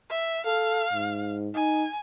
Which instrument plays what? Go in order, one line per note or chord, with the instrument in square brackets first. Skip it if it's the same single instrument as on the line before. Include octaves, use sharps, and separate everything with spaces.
[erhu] E5
[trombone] A4 [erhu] F5
[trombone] G#2
[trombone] D#4 [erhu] G#5